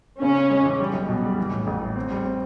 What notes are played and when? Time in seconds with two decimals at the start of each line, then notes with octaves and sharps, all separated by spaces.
0.22 C#3 C#4
0.37 C#3
0.50 G#3
0.66 E3
0.80 G3
0.94 B1
1.09 B2
1.23 G3
1.38 E3
1.52 A2
1.67 A1
1.82 A2
1.96 C4
2.11 G3
2.25 C4